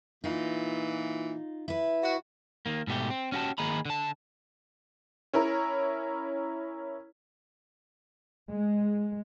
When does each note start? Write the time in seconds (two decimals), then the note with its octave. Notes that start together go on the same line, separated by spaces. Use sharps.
0.24 A#2 E3 D#4 F4
1.68 E4 B4
2.03 F#4
2.66 D#3 A#3
2.87 G#2 B2 A3 G4
3.10 C4
3.32 C#4 F#4 G4 A5
3.58 D#3 A#3 G#4 D#5 A#5 B5
3.85 D3 A5
5.34 C#4 E4 A#4
8.48 G#3